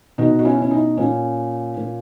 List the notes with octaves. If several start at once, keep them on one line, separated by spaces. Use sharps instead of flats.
B2 D#4 F#4
F#4
C#4 E4
C#4
D#4
A#2 C#4
A#2